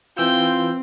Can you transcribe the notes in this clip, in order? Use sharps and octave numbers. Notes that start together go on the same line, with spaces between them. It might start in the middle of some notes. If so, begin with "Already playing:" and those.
E3 C4 F4 G5 E6 G6